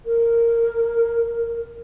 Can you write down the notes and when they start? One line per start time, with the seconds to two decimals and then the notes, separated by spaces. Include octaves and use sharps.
0.06 A#4